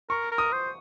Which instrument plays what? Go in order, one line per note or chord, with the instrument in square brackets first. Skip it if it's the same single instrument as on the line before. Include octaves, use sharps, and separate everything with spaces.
[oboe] A#4 [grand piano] C#6
[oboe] A#4
[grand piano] D#6
[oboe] C5